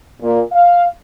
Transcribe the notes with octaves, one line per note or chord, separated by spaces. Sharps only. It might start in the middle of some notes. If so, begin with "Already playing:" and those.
A#2
F5